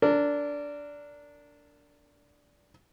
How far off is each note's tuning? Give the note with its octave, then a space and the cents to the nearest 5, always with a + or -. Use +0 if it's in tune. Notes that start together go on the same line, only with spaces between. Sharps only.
D4 -15 A#4 -30